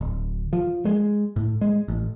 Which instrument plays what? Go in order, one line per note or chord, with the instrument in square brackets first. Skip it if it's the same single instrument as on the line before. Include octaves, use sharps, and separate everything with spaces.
[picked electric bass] D1
F3
G#3
A2
G#3
A1